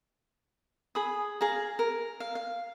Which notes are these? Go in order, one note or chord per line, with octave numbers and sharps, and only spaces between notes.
G#4 B5 D#6
G#4 F5 A#5
A#4
F5
F5